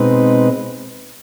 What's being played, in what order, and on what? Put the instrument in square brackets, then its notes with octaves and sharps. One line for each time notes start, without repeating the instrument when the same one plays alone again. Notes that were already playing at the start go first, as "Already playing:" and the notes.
Already playing: [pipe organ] B2 G#3 C4 D#4 B4